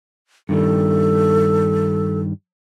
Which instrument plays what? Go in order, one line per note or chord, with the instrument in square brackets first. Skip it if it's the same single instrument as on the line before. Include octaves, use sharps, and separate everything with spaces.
[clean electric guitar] G2 D#3 G3 [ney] A4